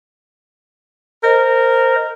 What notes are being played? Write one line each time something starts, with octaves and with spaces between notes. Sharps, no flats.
A#4 C5 D#5